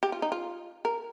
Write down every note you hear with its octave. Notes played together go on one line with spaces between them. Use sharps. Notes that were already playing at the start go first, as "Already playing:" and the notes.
G4
F4
D#4
F4
A#4